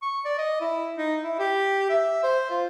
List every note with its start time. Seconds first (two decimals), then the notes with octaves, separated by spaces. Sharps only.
0.02 C#6
0.25 D5
0.38 D#5
0.61 E4
0.98 D#4
1.23 E4
1.39 G4
1.90 E5
2.23 C5
2.50 F4